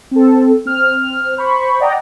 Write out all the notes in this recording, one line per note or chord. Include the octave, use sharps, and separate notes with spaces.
C4 A4
C4 F6
C5 B5 C#6
D5 D#5 F#5 G5 A#5